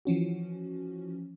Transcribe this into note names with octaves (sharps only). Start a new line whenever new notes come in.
E3 F3 C#4 F#4